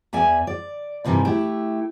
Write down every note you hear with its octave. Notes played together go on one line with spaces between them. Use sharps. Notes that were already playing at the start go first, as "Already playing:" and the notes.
E2 D5 E5 G#5
D5
G2 C3 D#3 E3 G3
A3 E4 G4